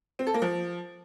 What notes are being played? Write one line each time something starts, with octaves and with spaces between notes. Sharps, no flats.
C4
A4
A#3
F3